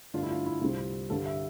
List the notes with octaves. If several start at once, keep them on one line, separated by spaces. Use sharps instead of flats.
G2 D3 A3 D4 F4
E4
F4
E4
C2 C3 G3 C4 F4
G2 D3 G3 A4
E5